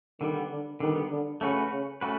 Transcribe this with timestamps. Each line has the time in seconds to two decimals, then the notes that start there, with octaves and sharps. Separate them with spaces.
0.20 D3 D#3 G3 B3
0.51 D3
0.80 D3 D#3 G3 B3
1.11 D3
1.41 C#3 A3 C#4 F#4 B4
1.71 C#3
2.01 A3 C#4 F#4 B4